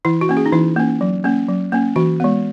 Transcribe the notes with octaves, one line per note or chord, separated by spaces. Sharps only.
E3 E4
F#4
A#3 C#4
G#4
D#4
E3 E4
A#3 C#4
F#3
A#3 C#4
F#3
A#3 C#4
E3 F#4
G#3 B3